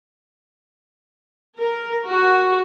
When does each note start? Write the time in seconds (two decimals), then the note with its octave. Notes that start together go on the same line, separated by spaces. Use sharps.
1.57 A#4
2.06 F#4